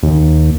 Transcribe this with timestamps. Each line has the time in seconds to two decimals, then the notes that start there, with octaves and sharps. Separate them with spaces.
0.03 D#2